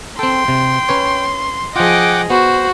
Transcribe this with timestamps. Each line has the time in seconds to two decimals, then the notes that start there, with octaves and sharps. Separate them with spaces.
0.19 C4 A4 G5 C6
0.48 C3
0.89 C#4 B4 C#5
1.76 F3 F4 G#4 D#5 F#5 G5 D6
2.30 B3 F#4 C5